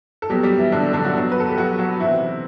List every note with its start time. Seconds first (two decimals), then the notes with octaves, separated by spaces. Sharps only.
0.22 A4
0.30 B2 F#3 G3 G4
0.43 G3 G4
0.58 E3 E4
0.72 D3 D4
0.93 D3 D4
1.04 F#3 F#4
1.15 B2 F#3
1.32 B4
1.40 A4
1.49 G4
1.57 F#3 F#4
1.79 F#3 F#4
2.00 C3 E3 E4